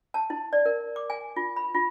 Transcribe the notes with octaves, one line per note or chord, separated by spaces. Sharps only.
A5
E4
D5
A#4
D6
G#5
F4
B5
F4